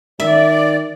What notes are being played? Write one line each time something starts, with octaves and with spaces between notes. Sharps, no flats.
D#3 D5 E5